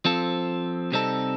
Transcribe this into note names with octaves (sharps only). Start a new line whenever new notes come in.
F3 C4 F4 A4
C3 G3 C4 D#4 A4